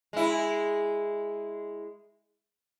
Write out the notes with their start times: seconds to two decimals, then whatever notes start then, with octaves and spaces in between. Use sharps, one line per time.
0.13 G#3 E4